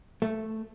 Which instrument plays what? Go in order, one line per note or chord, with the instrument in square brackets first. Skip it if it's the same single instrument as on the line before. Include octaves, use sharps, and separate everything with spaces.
[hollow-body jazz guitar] A3